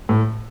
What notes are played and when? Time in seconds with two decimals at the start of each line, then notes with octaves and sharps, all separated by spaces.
0.09 A2